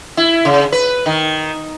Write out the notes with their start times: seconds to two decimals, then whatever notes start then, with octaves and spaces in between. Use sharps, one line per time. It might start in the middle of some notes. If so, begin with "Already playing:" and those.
0.17 E4
0.45 C#3
0.72 B4
1.06 D#3